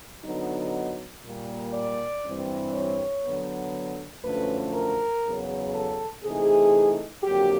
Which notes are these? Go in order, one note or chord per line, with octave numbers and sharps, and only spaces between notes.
D3 F#3 B3 D#4
A#2 G3 A#3
D5
G2 E3 G3 C4
C#5
D3 F#3 B3
F#2 D3 F3 A3 C#4 B4
A#4
E2 C#3 F#3 B3
A4
C3 E3 A3 C4 D#4 G#4
F2 D3 F#3 A#3 G4